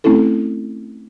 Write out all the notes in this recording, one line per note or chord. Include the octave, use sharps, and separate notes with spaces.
A3 C4 C#4 E4 A4